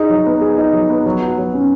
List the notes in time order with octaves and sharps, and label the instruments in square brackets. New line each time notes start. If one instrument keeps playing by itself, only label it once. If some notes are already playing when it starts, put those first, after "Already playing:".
Already playing: [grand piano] D#4 G#4
F#3
B3
G#4
D#4
F#3
B3
F#3
F#4
F#3
C#4